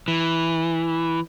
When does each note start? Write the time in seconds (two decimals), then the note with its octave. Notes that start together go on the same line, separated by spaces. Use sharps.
0.08 E3